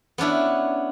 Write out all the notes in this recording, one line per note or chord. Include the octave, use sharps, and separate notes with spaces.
B3 C#4 D4 E4